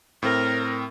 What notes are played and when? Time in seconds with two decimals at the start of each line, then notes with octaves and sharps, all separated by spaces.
0.23 A2 C4 A#4